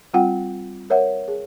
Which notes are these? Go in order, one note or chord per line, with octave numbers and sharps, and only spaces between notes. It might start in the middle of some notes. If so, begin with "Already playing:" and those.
G3 C4 F4 F#5 G5
A#4 C#5 E5 F#5
G#4